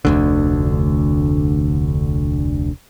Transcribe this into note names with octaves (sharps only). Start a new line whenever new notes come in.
F1 D2 D3